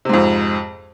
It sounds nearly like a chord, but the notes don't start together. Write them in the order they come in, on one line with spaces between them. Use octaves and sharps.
C3 G#2 F2